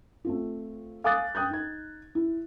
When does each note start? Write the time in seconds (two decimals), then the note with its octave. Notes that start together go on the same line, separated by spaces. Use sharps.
0.25 A3 C4 F4
1.04 F5 G#5 D6 D#6 F#6 A6
1.35 G5 D#6 F#6 G6
1.50 D#4 G#6
2.15 E4